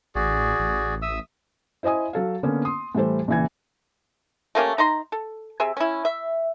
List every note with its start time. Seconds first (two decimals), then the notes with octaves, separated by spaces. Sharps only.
0.15 A1 F#4 G#4 D5
0.59 A1
1.02 E5 D#6 E6
1.83 E4 C5 D#5 G#5 D#6
2.13 F#3 A4 F5
2.43 D3 A#3 B3 C#4
2.65 C6 D#6
2.95 A2 E3 G3 A4 C5
3.28 A#1 C#3 E3 G#6
4.55 A3 A#3 C#4 G4
4.78 D#4 A#5 C6
5.12 A4
5.60 C3 G#4 E5
5.77 C#4 E4
6.05 E5